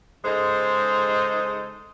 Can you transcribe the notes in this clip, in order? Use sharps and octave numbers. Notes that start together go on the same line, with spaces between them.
C#3 G#3 D#4 A4 C5